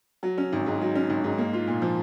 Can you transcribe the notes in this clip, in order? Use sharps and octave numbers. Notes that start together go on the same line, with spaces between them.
F#3
C#4
G#1
G#2
F#3
C#4
G#1
G#2
A#3
F4
A#2
F3